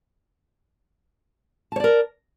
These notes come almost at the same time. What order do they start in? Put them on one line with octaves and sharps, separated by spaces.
A5 C#5 D5 A#4